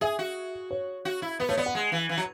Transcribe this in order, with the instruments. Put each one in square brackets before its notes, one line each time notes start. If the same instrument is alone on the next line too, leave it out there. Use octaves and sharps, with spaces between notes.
[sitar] G#4 [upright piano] E5
[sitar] F#4
[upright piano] C#5
[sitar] F#4
E4
[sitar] B3 [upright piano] B4
[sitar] A3 [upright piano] C#5
[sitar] B3 [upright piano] D5
[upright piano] F#5
[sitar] G#3
E3
E3
F#3